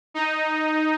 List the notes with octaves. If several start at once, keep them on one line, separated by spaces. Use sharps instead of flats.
D#4